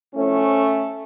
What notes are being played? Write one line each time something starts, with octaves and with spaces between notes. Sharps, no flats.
A2 F3 A3 C#4